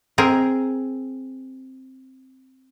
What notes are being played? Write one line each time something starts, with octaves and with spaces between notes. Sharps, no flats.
C4 G#4 A#4